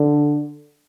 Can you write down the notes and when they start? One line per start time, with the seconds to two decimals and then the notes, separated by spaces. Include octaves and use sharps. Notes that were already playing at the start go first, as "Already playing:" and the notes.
Already playing: D3